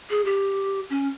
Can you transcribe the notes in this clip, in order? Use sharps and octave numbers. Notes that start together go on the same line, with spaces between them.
G#4
G4
C#4